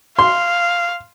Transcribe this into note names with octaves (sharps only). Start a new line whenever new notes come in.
F5 C6